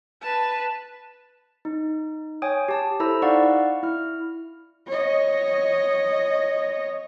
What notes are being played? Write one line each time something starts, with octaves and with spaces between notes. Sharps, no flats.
B4 A5
D#4
C#5 G5 G#5 D#6
G4 A5
E4 A4 C5 A#5 B5 E6
D#4 D5 F5 F#5 C#6
E4 F6
C#5 D#5